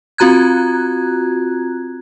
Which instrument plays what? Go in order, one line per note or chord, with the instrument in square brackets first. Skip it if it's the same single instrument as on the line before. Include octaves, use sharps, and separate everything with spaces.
[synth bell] C4 F4 F#4 A#5 F#6 G#6